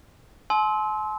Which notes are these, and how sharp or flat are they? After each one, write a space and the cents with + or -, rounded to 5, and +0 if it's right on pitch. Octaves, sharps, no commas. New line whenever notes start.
A5 -45 C6 +0 E6 -30